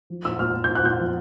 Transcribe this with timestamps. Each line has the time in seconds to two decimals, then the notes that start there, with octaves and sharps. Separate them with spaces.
0.10 F3
0.25 A#2 E6
0.39 A#2 F6
0.54 A#2
0.64 G6
0.69 A#2
0.75 F#6
0.84 A#2 G6
1.00 F3